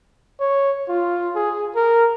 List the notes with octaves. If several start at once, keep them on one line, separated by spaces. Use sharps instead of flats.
C#5
F4
G#4
A#4